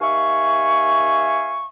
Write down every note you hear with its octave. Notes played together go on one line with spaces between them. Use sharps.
D#2 E5 F5 G#5 C#6